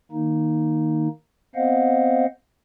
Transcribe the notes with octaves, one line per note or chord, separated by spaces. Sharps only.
D#3 A#3 D#4
B3 C4 C5 D#5 F5 F#5